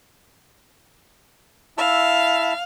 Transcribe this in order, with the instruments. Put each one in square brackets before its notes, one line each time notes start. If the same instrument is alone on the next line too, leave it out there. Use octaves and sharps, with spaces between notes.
[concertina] E4 E5 A5 [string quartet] F5